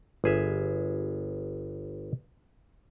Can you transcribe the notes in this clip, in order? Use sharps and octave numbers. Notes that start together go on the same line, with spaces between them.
G1 G#4 E5